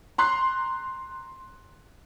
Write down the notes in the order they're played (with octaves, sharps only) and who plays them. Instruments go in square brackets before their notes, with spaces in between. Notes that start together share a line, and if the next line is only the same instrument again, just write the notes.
[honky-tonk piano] A#5 C6 F#6 C7